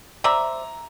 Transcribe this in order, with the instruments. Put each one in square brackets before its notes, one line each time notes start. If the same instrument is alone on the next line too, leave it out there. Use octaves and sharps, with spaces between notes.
[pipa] C5 D5 E5 [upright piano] A#5